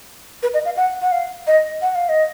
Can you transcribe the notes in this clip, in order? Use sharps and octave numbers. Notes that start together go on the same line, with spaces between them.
B4
D#5
F5
F#5
F#5
F5
D#5
F#5
F5
D#5